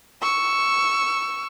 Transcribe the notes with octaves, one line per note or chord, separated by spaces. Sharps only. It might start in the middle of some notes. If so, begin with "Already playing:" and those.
C#6 E6